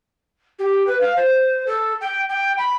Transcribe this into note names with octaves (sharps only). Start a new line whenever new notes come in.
G4
B4
F5
C5
A4
G5
G5
B5